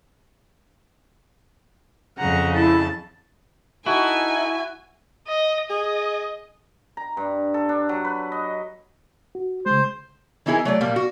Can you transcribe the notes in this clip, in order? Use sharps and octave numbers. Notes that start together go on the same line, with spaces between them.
F2 C#3 F#5 A#5
E4 A5
D#4 E4 F#4 A4 G#5
D#5
G#4 D#5
A#5
G2
A4
D4
F#3
B4
D#5
F#4
C#3 G#3 C5
E3 B3 D#4 E4 G#4 A#4
F#3 A3 D5
A#2 G3 A#3
F#4